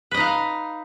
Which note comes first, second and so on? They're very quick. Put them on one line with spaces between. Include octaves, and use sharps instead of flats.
B4 D#5 D#4 F5